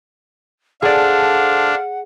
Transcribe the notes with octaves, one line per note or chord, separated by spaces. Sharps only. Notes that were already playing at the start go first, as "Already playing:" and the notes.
D4 G#4 A4 C5 D5 F5 F#5